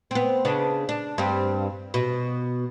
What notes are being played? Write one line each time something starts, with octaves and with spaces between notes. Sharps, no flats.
B3 C4
C#3 B3 D4
D4
G2 C4
B2